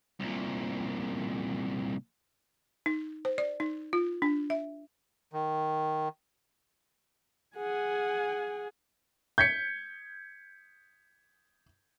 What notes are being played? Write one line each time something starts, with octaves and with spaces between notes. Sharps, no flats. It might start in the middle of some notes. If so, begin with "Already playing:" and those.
C2 A#2
D#4
C5
D5
D#4
F4
D4
E5
D#3
G#4 F#5 G#5
G6 G#6 B6 C#7